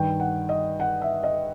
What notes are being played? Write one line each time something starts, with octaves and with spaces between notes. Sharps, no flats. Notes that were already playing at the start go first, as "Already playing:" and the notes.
Already playing: G2 D#3 G5
F#5
D#5
F#5
E5
D#5